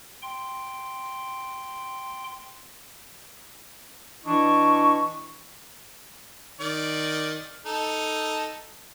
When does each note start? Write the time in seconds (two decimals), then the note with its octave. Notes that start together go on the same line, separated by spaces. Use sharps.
0.22 G5 C6
4.25 E3 D4 E4 D#5 C#6
6.60 D#3 D5
7.66 D#4 A4